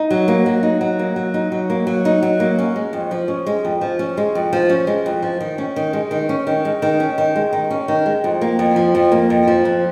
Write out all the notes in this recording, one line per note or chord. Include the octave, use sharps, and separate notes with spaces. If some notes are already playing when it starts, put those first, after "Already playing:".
Already playing: D#4
F#3
A#3
F#3
D#4
F#3
A#3
F#3
D#4
F#3
A#3
F#3
D#4
F#3
A#3
C#4
G#3
F2
F3
C#4
G#3
F2
F3
C#4
G#3
F2
F3
C#4
G#3
F2
F3
D#3
C#4
D#3
G#3
D#3
C#4
D#3
G#3
D#3
C#4
D#3
G#3
D#3
C#4
D#3
G#3
F2
A#3
F2
F3
F2
A#3
F2
F3
F2